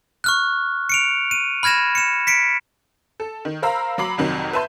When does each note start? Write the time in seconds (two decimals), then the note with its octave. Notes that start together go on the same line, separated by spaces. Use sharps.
0.24 C#6 F6 F#6
0.89 C#7 D7 F7
1.31 D#7
1.63 B5 F6 G#6 A#6 E7
1.95 C#7 E7
2.27 B6 C#7 D7
3.20 A4
3.45 D#3
3.62 A#4 C5 F5 A#5 B5 E6
3.98 F#3 A#5 B5 D6 C7 F#7
4.17 C2 F2 D#3 F#3
4.53 B4 E5 A5 C6 G6